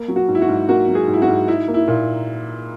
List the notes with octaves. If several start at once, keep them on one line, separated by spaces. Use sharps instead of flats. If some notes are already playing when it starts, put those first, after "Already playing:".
Already playing: A#3
F#3
F#4
G#2
E4
F#4
G#2
A#3 F#4
F#3
G#4
G#2
E4
F#4
G#2
D#4 E4
A#3
E4
A#2